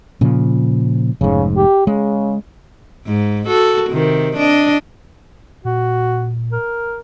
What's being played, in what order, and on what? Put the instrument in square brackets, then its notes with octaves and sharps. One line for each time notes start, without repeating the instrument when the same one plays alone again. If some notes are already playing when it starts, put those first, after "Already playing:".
[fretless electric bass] A#2 C#3 F3
[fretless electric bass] F1 G#2 [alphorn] C#3
[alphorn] G4
[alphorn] C#3 [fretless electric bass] G#3
[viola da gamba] G#2
F#4 A4
C3 D#3
D4 D#5
[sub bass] A#2 [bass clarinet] F#4
[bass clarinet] A#4